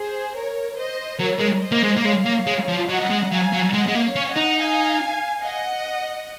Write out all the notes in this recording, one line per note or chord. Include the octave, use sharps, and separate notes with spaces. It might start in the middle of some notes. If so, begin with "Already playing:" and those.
Already playing: G#4 C5
A#4 C#5
C5 D#5
F#3 A#4 C#5
G#3
C5 D#5
A#3
G#3
A#3
G#3 C#5 F5
A#3
G#3
F3
F#3 D#5 F#5
G#3
F#3 F5 G#5
F#3
G#3 D#5 F#5
G#3
A#3
C#5 F5
C#4
D#5 F#5
D#4
F5 G#5
D#5 F#5